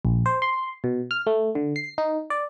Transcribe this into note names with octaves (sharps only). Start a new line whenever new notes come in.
A#1
C5
C6
B2
F6
A3
D3
C7
D#4
D5